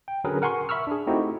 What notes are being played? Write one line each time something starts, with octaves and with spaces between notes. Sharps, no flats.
G5
D3 F#3 C#4 G#4 A#4 B4
A#4 F#5 G#5 C6 C#6
E5 B5 C#6 E6 F6
D4 G#4
A3 C4 D#4 E4 F#4 G4